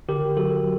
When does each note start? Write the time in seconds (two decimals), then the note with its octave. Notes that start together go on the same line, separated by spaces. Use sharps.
0.08 D3 G4 A#4
0.37 F#3 F#4 A4